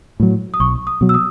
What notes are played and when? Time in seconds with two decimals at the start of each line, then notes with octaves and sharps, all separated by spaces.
0.20 A2 F#3
0.54 D#6
0.60 B1 C#6
0.87 D#6
1.01 B2 F#3
1.09 E6
1.14 D#6